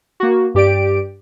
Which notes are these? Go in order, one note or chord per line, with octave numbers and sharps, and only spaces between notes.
A#3 F#4
G2 G4 D5 D7